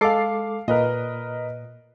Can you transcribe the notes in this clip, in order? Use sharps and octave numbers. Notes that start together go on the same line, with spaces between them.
G#3 A4 F5 D6 C7
A#2 A#4 B4 D#5